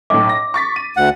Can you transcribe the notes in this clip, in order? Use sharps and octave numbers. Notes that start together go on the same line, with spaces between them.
B1 A2 D6
A#6
C#6 A6 B6
D#7
D2 F#5